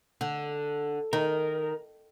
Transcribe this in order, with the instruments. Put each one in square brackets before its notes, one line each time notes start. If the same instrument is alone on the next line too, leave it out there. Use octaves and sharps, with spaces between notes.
[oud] D3
[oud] D#3 [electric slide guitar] A#4